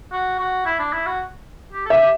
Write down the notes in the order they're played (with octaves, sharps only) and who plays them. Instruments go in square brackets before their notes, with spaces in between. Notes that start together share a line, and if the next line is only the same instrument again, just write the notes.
[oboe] F#4
F#4
E4
D4
E4
F#4
G4
A4
[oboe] G4 [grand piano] E5
[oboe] G4